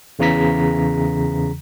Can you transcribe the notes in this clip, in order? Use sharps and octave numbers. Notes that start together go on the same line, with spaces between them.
E2 C#3 E3 A#5 B6